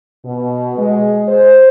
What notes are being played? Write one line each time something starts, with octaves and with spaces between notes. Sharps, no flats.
B2
G#3
C5